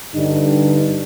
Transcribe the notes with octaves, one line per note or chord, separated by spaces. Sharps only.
G2 D3 G3 D4 D#4